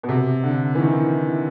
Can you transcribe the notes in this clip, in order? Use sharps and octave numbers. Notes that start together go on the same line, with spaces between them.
B2
C3
D3
E3
D#3